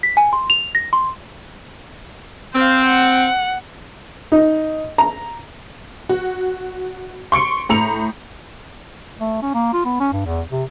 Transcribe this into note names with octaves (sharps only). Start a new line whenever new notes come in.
B6
G#5
C6
F7
A#6
C6
C4 C5 F5
F#5
D#4
A#5
F#4
C6 C#6 C#7 D7
A2 A#5 C#7 F7
A3
C#4
A#3
F4
B3
C#4
G2
E2
C3